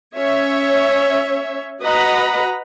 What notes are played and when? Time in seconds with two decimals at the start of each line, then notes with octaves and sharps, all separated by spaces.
0.17 C#4 C#5 E5
1.82 F#4 B4 D#5 F#5 A#5 B5